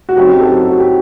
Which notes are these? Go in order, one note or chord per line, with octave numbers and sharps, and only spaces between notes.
F#4
F#2 F#3 C4 D#4 G4
A4
G4
F#4
G4